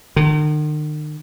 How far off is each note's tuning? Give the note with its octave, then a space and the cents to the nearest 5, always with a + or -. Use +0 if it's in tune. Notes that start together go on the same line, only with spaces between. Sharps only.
D#3 -45